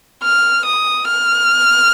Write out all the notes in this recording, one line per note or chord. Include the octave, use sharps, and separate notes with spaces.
F6
D#6
F6